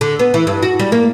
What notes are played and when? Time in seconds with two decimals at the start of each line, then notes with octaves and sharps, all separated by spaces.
0.01 D3
0.19 B3
0.34 E3
0.47 G2
0.63 F#4
0.79 G3
0.92 A#3